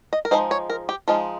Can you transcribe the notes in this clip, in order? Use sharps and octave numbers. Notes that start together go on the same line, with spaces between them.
D#5
A#4
F3 G#3 D#4 C5
C#5
A#4
G4
F3 G#3 D#4 F4